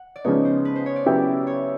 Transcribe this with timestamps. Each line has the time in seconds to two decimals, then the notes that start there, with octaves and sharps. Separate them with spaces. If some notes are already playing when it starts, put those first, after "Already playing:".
Already playing: F#5
0.16 D5
0.24 C#3 F3 G#3 B3 D#4 C#5
0.45 C5
0.65 B4
0.76 C5
0.86 C#5
0.96 D5
1.06 C#3 F#3 B3 E4 G4
1.47 C#5